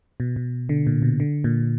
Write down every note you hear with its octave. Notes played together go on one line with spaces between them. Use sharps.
B2
B2
D3
A#2
B2
D3
A#2